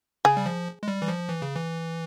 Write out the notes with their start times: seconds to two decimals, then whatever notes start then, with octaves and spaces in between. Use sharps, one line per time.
0.25 C#3 G#4
0.37 G3
0.46 F3
0.83 G#3
0.88 G3
1.02 E3
1.08 F3
1.30 E3
1.42 C#3
1.56 E3